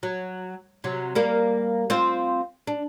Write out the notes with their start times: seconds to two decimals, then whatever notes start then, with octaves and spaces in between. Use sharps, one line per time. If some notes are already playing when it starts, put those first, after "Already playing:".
0.03 F#3
0.84 C3 F#3
1.15 G3 A#3 A#4
1.90 C4 F4 C5
2.67 D4